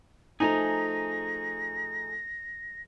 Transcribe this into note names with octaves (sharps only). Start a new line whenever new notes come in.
F3 A3 D#4 G#4 G#5 A#5 A#6